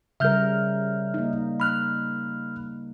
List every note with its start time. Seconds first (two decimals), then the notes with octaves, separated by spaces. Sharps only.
0.20 C#3 G3 A#4 E5 F6 G6
1.14 A#3 D#4
1.60 B5 F6 F#6